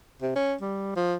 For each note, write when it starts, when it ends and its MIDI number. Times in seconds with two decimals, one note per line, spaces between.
0.22 0.34 48
0.36 0.55 61
0.61 0.92 55
0.96 1.16 53